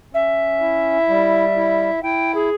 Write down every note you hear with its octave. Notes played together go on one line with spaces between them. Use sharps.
C#4 E5
E4
G3
E4
E4 G5
G#4